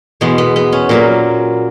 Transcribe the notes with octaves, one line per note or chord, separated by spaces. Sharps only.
E2 B2 G#3 B3
B3
B3
C#4
A#2 F#3 A#3